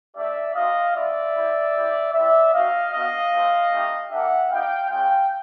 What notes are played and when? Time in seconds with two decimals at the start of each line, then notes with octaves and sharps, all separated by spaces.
0.16 A3 D4 G4 D5 E5
0.56 C4 D#4 F#4 D#5 F5
0.95 B3 D4 F4 D5 E5
1.35 C4 E4 G4
1.74 C4 E4 G4
2.14 G3 C4 E4 D5 E5
2.53 C4 D#4 F#4 D#5 F5
2.92 B3 D4 F#4 D#5 F5
3.33 A3 C4 F4
3.72 A3 C4 D#4 G4
4.11 A#3 D4 G4 E5 F#5
4.50 B3 D#4 G4 F5 G5
4.90 G#3 C#4 F4 F5 G5